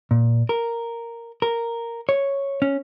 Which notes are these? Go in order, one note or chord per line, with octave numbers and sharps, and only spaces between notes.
A#2
A#4
A#4
C#5
C#4